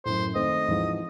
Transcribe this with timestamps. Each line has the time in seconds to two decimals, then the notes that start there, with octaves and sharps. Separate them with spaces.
0.06 F#2 A2 C5
0.35 D#3 A3 C4 D#5
0.68 G#2 E3 F3